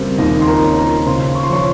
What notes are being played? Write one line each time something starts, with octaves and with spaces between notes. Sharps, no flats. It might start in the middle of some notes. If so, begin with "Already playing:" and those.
Already playing: C#3 G3 A#3 C4 C5
D#2 D#4 D#5
C6
A#4 A#5
C#4
A#4 A#5
C#3 C5 C6
C#6
C6
F3 C#5 C#6